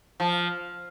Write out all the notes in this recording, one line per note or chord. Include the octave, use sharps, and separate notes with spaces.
F3